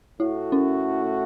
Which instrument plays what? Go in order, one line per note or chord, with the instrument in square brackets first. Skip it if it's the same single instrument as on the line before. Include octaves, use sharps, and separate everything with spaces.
[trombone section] A2 A3 F#4 [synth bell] E4
[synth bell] C#4